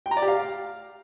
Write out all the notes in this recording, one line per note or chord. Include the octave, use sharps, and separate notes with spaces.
G5
A#5
D5
G4
F5